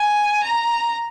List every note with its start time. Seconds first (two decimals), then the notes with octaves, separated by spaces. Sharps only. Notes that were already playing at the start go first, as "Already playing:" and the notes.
Already playing: G#5
0.43 A#5